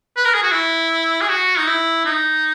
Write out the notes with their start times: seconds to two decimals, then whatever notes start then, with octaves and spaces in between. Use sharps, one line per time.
0.17 B4
0.25 A#4
0.34 G#4
0.43 F#4
0.52 E4
1.21 G#4
1.29 F#4
1.58 D#4
1.67 E4
2.05 D#4